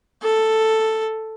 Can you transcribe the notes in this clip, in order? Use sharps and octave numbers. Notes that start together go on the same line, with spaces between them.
A4